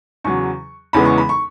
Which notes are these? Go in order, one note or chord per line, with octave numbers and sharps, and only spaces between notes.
E2 C#3 F#3 C#6
E2 C#3 E3 G#3 B3 B5
C#6
B5
C#6